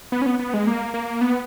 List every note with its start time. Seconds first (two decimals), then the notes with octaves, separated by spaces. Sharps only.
0.12 B3
0.22 C#4
0.26 B3
0.39 B3
0.54 G#3
0.67 A#3
0.94 A#3
1.21 B3